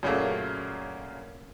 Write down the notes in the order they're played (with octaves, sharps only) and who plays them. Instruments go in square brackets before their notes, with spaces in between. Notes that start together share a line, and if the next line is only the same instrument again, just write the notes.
[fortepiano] F#2 A#2 C#3 A3 A#3